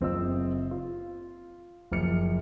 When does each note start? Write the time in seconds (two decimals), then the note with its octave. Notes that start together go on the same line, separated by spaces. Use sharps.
0.01 F#1 C4 F4 D#5 E6
0.71 F4
1.91 F#1 F3 F6 C#7